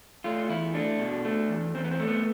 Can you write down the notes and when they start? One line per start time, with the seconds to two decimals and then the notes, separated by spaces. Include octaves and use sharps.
0.24 A3 F4
0.49 E2 E4
0.74 A3 D4
1.00 B2
1.25 A3
1.50 E2
1.75 E2 C4
1.84 B3
1.91 C4
2.00 A3
2.08 B3